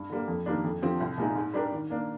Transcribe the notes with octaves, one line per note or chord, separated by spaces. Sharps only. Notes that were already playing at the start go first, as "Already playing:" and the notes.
Already playing: G2
D3 G3 A#3
F2
D#3 G3 A#3 D4
F2
D3 F3 C4 G4
C2
A#2 G#3 D#4
G#2
G3 D4 G4 A#4
D#3
A#3 D4